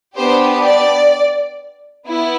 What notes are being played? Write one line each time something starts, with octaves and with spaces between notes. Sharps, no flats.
B3 D4 G4 C5
D5
B3 E4